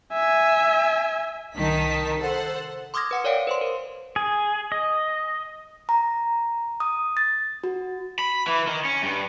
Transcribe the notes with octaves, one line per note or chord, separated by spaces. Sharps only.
E5 G#5
C2 D#3 D#4 A#4 A5 B6
A4 C5 F#5
C6 D6 D#6 F6 G#6 A#6
B4 F#5 C#7
A#4 C#5 D5 F5 G5 D7
B4 C5 C6
A#4
G#4
D#5
A#5
D#6
A6
F#4
B5
E3
D#3
C#4
G2